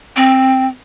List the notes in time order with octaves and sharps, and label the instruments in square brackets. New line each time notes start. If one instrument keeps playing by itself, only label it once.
[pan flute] C4